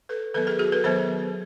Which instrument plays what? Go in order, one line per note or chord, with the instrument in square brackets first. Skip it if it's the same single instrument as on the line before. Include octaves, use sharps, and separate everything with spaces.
[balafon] A4 B4
D#3 F#3 B3 A4 B4
G#4 A#4
F#4 G#4
A4 B4
D#3 F#3 B3 A#4 C5